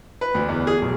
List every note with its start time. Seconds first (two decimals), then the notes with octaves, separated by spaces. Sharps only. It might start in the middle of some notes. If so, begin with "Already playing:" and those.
0.21 B4
0.35 D2
0.48 E2
0.67 G#4
0.82 B1